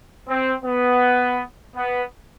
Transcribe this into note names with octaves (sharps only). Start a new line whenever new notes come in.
C4
B3
B3